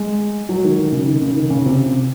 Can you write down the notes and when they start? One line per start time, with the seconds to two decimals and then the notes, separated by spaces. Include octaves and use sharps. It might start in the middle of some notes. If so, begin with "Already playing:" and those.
Already playing: G#3
0.49 F#3
0.64 D#3
0.78 D#3
0.92 C#3
1.08 D#3
1.22 C#3
1.36 D#3
1.50 C#3
1.66 C3